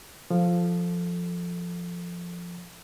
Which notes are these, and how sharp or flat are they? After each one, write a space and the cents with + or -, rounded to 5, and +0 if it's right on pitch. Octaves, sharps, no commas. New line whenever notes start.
F3 +0 A4 +0